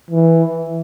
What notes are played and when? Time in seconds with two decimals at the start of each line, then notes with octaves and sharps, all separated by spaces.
0.10 E3